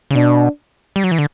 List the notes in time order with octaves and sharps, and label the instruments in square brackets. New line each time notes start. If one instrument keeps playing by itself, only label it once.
[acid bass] C#3
[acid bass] B2 [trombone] D4
[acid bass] G3
F#3
E3
D3